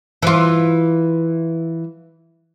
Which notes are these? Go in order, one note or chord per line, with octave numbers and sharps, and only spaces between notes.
E3 F4